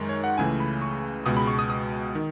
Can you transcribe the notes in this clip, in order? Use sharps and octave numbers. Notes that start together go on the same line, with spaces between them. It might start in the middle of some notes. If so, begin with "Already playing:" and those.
Already playing: F#2 D#3 G#3
C#5
F#5
C#2 C#3 E3 A3 G#5
B5
C#6
C#2 B2 G#3 D#6
B5
C#6
D#6
D#6
D#3